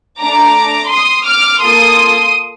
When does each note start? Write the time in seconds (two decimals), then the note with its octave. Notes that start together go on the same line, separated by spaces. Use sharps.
0.21 A3 D4 A4 A#5 D6
0.91 C6 D#6
1.27 D6 F6
1.62 A#3 F4 A4 C6 D#6